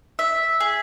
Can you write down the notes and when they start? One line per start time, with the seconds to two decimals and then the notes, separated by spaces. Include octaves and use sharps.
0.19 E5
0.60 G#4